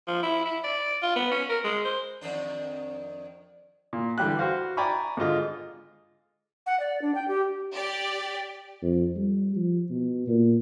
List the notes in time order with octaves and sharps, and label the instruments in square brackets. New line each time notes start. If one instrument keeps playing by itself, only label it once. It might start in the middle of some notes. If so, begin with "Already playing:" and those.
[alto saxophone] F3
E4
E4
D5
F4
B3
C#4
A#4
G#3
C5
[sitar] F2 D#3 D4
[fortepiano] A#2
D3 E3 G3 G4 F#6
F#4 C5 F5
D5 G5 G#5 A#5 B5 C#6
G#2 D3 F4 D#5
[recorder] F#5
D5
D4
G5
G4
[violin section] G4 D5
[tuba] F2
G3
F3
B2
A#2